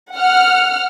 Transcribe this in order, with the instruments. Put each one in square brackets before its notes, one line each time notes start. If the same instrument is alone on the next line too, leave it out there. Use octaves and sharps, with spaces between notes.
[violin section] F#5 F6